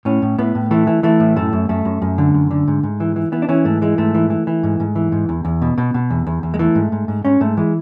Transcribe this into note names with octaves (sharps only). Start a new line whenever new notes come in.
A2 C#4
A2
A2 B3
A2
E3 A3
E3
E3 A3
A2
F#2 A3
F#2
F#2 A3
F#2
F#2
D3
F#2
D3
G#2
G#2
E3
E3
E3 B3
D4
E3 C#4
G#2 A3
E3 G#3
G#2 A3
E3
E3
E3
G#2
G#2
E3
G#2
E2
E2
B2
B2
B2
E2
E2
E2
G#3
E3 A3
G#2
G#2
G#2
G#2 C#4
G#2 A3
E3 G#3